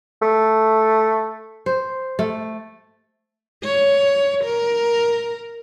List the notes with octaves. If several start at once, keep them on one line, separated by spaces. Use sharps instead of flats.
A3
C5
A3
C#5
A#4